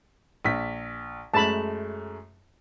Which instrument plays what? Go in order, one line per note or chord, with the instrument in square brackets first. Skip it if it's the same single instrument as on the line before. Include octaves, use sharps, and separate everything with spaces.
[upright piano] A#1 B6
[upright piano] F#2 G#3 A3 [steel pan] A5 B5